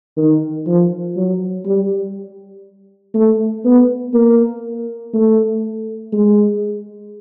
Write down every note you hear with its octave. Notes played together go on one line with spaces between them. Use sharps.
D#3
F3
F#3
G3
A3
B3
A#3
A3
G#3